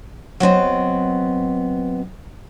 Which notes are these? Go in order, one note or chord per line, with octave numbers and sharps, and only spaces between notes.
F#3 B3 C4 D#5